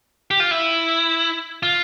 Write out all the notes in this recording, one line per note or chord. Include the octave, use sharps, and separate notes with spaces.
G4
F4
E4
F4